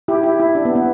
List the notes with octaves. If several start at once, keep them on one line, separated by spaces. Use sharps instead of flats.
E4 G4
E4 G4
E4
D4
B3
B3